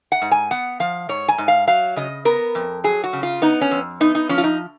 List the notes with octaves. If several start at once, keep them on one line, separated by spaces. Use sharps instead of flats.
F#5
G#2
G#5
B3 F#5
F3 F5
G#2 C#5
G#5
G#2
F5
F#3 F5
C#3 D#5
B3 A#4
F2
F#3 G#4
F#4
C#3
F4
B3 D#4
C#4
F2
B3 D#4
D#4
F3 C#4
F4
D#4